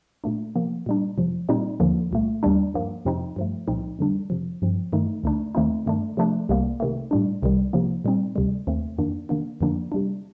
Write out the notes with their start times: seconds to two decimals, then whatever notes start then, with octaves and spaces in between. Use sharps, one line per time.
0.24 A#2 A3 D4
0.55 C3 F3 A#3
0.86 A#2 G3 D4
1.18 F2 C3 F3
1.49 A#2 G3 C4 D#4
1.80 D#2 D3 F3 A#3
2.11 C2 A#2 A3
2.43 D#2 D#3 G3 D4
2.74 G2 F3 A#3
3.05 F2 C3 F3 C4 D#4
3.36 G2 F3 A3
3.67 C2 A#2 F3 C4 D#4
3.99 F2 D3 G3 D4
4.30 F2 C3 F3
4.62 G2 F3 C4
4.93 G2 D#3 A3 D#4
5.24 D2 D3 A3 D4
5.55 D#2 D#3 A3 C4 D#4
5.86 G2 D#3 A3 D4
6.17 C3 F3 A3 D4
6.49 C2 C3 G3 A#3
6.80 C3 D#3 A3
7.11 A2 G3 D4
7.42 C2 C3 D#3 G3
7.73 C3 F3 A#3 D#4
8.04 A#2 G3 C4 D#4
8.36 D2 C3 G3
8.67 D#2 D#3 A3 C4
8.98 F2 D#3 A#3 D4
9.29 C3 D#3 A#3 D4
9.61 F2 D3 F3 A#3 D4
9.92 C3 G3 D4